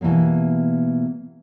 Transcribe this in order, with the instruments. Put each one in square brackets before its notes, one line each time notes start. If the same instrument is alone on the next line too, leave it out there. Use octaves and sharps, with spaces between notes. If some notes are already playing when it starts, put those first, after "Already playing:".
[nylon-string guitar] B2 E3 G3 A#3 B3